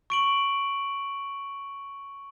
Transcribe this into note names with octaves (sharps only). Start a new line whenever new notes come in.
C#6 D7 F#7